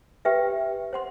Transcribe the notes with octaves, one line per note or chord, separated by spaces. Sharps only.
G4 B4 E5 G5
C5 F#5 C6